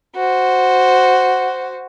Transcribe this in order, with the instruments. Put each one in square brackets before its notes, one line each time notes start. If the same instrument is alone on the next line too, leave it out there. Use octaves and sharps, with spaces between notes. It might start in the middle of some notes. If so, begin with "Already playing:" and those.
[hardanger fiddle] F#4 C5